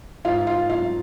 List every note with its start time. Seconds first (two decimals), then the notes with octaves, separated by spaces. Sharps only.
0.25 G#2 F4 F5
0.47 F4 F5
0.69 F#3 F4 F5